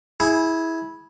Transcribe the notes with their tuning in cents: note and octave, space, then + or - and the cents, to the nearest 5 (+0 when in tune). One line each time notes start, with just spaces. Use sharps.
E4 -15 G#4 +0